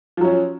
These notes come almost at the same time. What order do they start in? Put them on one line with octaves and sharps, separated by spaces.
F3 F#3 C#4